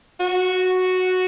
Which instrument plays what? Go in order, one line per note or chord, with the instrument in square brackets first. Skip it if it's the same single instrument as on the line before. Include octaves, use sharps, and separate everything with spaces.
[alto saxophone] F#4